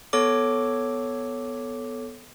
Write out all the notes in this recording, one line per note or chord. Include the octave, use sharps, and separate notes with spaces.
B3 A4 C#5 D6